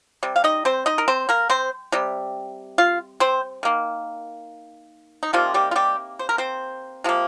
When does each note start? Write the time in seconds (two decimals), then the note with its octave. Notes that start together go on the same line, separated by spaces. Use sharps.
0.23 C3 G3
0.36 F5
0.44 D#4 D#5
0.65 C4 C5
0.86 D#4 D#5
0.98 A#4
1.08 C4 C5
1.29 A#3 A#4
1.50 C4 C5
1.92 C3 G3
2.78 F4 F5
3.20 C4 C5
3.63 D#3 A#3
5.23 D#4
5.33 C3 D#3 F3 G3 A#3 F4
5.54 G3 G4
5.71 F4
5.76 G3 G4
6.19 C5
6.29 A#4
6.38 C4 C5
7.04 C3 F3 A#3